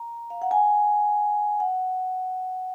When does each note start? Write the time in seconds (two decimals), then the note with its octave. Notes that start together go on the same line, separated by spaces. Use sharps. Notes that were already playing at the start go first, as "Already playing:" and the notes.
Already playing: A#5
0.30 F5
0.42 F#5
0.51 G#5
1.60 F#5